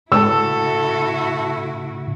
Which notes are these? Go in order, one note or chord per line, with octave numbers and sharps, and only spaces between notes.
A2 C#3 E4 F#4 A4 E6